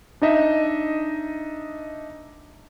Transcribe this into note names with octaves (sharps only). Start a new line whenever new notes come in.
D4 D#4 D#5 E5